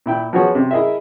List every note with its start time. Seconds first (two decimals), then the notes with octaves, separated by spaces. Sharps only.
0.06 A#2 E4 G5 B5
0.33 F3 B3 F#4 G#4 C#5
0.55 C3
0.71 E4 G#4 A#4 D#5 E5